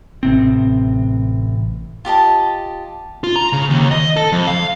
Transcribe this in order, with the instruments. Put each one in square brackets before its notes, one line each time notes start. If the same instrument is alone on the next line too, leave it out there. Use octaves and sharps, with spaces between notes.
[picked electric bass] A1 C3 C4
[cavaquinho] F4 G4 D#5 A5
[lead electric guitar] F4
A#5
C#3
D#2
D#5
A4
F2
F5